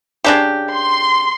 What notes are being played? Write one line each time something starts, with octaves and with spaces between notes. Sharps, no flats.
C#3 D4 G4
C6